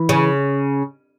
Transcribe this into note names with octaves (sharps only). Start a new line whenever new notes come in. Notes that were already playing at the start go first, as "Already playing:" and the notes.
Already playing: E3
C#3